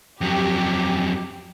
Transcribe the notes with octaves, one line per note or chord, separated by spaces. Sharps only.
F2 F#3 G4